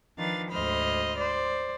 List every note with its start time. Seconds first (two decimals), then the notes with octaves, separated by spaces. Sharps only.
0.18 D#3 F3 D4 B4 F5 A6
0.51 D2 G#2 C5 D#5 B5 F6
1.17 C5 D5